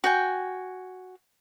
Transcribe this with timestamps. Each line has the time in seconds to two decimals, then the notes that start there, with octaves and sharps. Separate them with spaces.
0.04 F#4 G5 G#5